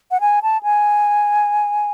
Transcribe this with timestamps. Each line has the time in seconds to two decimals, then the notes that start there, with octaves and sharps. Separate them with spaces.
0.11 F#5
0.20 G#5
0.42 A5
0.63 G#5